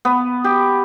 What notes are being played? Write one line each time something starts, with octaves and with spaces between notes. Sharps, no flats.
B3
G4